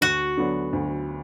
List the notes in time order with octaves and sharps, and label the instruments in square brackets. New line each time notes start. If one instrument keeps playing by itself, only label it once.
[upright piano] D2 [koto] F#4
[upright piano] D3 F#3 B3 D4
D2